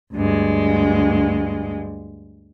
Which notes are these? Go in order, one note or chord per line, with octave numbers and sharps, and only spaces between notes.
D2 G2 G#3